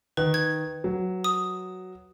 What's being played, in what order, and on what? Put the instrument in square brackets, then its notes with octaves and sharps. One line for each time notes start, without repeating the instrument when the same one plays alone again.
[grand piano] D#3 [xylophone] B4
[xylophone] G#6
[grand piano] F#3
[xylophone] D#6